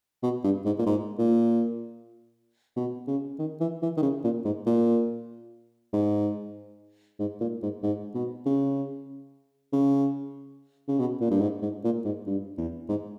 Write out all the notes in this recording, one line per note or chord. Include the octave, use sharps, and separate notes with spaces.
B2
G2
G#2
A#2
G#2
A#2
B2
C#3
D#3
E3
E3
D#3
C#3
A#2
G#2
A#2
G#2
G#2
A#2
G#2
G#2
B2
C#3
C#3
C#3
B2
A#2
G2
G#2
G#2
A#2
G#2
G2
E2
G#2